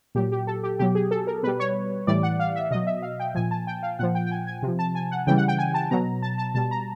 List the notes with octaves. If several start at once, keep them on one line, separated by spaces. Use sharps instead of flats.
A#2 F#3 G4
G4
A4
G4
B2 F#3 G4
G#4
A4
A#4
B2 G3 B4
C#5
A2 E3 G3 D5
F#5
F5
E5
B2 F#3 D#5
E5
F5
G5
A#2 F3 G#5
A5
G5
F5
A#2 F3 F#5
G5
G5
G#5
G#5
C3 F3
A5
G#5
F#5
C#3 E3 G3 G5
F#5
G5
G#5
A5
B2 F#3 A#5
A5
A5
B2 G3 A5
A#5